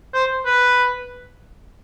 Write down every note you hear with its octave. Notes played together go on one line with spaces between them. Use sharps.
C5
B4